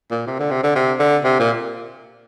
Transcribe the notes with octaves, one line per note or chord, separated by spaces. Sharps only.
A#2
C3
D3
C3
D3
C3
D3
C3
A#2